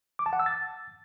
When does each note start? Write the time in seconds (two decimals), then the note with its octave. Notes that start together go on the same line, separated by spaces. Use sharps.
0.19 D6
0.26 A5
0.33 F#5
0.39 E6
0.46 A6